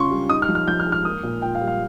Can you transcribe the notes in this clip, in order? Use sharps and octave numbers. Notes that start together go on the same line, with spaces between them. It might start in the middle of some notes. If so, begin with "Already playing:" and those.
Already playing: C#3 C#4 F4 C6 C#6
G3
D#4 D#6
F6
F3
F6
F3 G6
F6
G#3
F6
A#3 D#6
A#2
F4 G5
F5
G3
F5